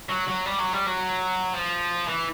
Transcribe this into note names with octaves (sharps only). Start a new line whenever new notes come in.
F#3
F#3
G3
F#3
G3
F#3
F3
E3